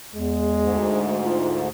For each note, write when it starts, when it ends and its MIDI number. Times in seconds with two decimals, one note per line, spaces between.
0.15 0.83 40
0.15 1.46 56
0.62 1.69 38
0.62 1.69 44
1.25 1.61 65